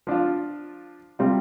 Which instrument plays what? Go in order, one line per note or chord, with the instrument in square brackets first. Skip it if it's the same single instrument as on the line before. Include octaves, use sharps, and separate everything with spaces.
[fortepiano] F3 D4 F4
C3 G3 C4 F4